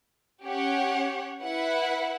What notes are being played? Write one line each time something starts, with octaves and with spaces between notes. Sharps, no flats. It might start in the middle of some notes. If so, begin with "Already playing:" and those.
C#4 G4 C#5 F#5
E4 B4 F#5